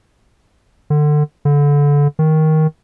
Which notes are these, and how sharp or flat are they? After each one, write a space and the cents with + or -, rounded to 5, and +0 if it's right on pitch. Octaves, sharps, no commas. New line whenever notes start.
D3 +25
D3 -25
D#3 +10